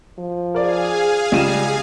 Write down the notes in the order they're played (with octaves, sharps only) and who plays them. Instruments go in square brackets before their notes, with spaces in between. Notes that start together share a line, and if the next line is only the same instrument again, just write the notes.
[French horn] F3
[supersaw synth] G#4 F5 G#5 [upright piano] A#4 D5
[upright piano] C#2 D#7 E7 [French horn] G3